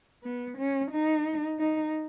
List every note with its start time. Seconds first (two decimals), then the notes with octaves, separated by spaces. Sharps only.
0.24 B3
0.58 C#4
0.91 D#4
1.59 D#4